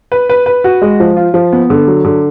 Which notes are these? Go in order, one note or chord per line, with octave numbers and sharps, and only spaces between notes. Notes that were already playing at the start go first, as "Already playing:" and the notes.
B4
B4
B4
F#4
G#3
F3
F4
F3
B3
D3
F#3
D3